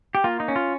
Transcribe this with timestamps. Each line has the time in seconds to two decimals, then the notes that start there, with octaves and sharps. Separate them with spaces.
0.15 G4
0.24 A#3 F4
0.40 D#4
0.48 C#4
0.56 F4